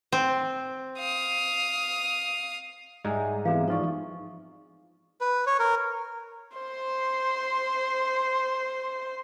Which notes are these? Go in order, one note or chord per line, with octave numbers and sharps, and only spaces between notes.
C4
F5 D#6
G#2 G3 G#3 E5 G#5 A#5
E3 B3 C4 G#4 E5 F5
F3 D#4 F4 D5 C#6
B4
C#5
A#4
C5 C6